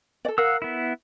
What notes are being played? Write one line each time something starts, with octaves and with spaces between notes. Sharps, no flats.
A4 D5
A#4 F5 F#5 E6
B3 E4